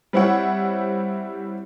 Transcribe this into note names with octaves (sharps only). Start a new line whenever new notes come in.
G3 C4 E4 C#5 F#5